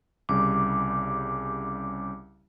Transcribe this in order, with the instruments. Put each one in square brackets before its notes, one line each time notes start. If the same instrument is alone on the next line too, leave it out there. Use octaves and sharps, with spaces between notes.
[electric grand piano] C2 C#3 G3 [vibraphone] D6